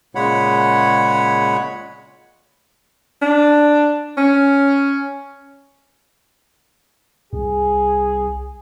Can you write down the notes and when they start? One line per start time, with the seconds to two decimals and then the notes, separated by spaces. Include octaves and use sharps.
0.15 A#2 C#3 G#3 C#5 F#5 B5
3.22 D4
4.17 C#4
7.33 C2 G#4